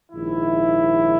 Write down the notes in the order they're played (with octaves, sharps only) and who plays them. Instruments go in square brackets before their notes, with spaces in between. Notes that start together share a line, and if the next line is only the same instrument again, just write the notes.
[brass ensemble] A#1 G#2 D#3 E4